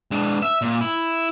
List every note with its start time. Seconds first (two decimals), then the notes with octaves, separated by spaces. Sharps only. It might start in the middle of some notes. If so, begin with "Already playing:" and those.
0.11 G#3 D4
0.42 E5
0.62 A#2
0.81 E4